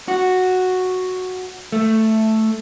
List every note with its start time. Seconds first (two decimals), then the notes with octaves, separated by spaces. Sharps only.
0.08 F#4
1.72 A3